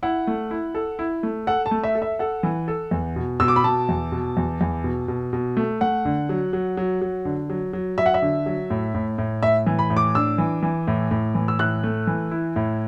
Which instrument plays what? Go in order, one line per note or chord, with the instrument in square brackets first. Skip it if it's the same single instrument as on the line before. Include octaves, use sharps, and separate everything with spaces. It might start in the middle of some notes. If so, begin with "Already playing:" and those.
[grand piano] E4 [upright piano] F#5
[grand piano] A3
E4
A4
E4
A3
[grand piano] A4 [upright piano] F#5
[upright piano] A5
[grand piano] A3
[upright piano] E5
[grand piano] A4
[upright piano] E5
[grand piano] A4 [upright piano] F#5
[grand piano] E3
A4
E2
B2
[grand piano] B2 [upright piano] E6
[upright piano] D6
B5
[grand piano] B2 [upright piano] A5
[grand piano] E2
B2
E2
E2
B2
B2
B2
A3
[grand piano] A3 [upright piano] F#5
[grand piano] D3
F#3
F#3
F#3
F#3
D3
F#3
F#3
[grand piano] F#3 [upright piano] E5
[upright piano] F#5
E5
[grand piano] D3
F#3
A2
A2
A2
[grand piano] A2 [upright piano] E5
[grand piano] E3
[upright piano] B5
[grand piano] A2
[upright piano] D6
[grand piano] D4 [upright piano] E6
[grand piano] E3
E3
A2
A2
E3
[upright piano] E6
[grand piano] A2 [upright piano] F#6
[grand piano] A3
E3
E4
A2